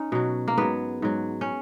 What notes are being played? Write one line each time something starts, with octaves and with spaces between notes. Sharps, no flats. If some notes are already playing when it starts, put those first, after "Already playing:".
Already playing: C#4 D#4
B2 F#3
A#3
G#2 F#3 B3
G#2 F#3
C#4